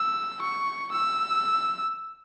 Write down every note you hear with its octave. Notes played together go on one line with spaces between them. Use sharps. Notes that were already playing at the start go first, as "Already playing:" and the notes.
Already playing: E6
C#6
E6